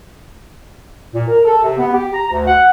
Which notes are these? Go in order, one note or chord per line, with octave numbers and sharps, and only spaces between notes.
A#2
A#4
A4
C3
B3
G4
A#5
D2
F#5